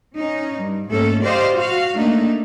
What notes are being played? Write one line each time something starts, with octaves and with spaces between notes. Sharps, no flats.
C#4 D#4
G2
G#2 A3 A#3 C#4 A4
G4 C5 D5 D#5 F5
F#4 F5
A3 A#3 D4 D#4